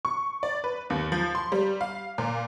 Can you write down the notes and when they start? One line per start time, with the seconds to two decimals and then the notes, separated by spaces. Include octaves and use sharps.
0.05 C#6
0.43 D5
0.64 B4
0.90 D#2
1.12 F3
1.35 C6
1.52 G3
1.81 F5
2.18 A#2